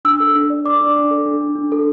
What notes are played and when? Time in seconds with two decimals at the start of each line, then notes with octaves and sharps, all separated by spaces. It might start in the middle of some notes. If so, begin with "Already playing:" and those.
0.05 D4 E6
0.20 A4
0.35 D4
0.50 D5
0.65 D5 D6
0.81 D4
0.96 D4
1.11 A4
1.26 D4
1.41 D4
1.56 D4
1.72 A4